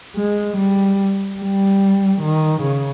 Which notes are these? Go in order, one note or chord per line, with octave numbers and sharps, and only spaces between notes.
G#3
G3
G3
D#3
C#3